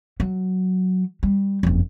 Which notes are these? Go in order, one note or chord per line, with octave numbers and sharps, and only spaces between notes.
F#3
G3
F#1 F2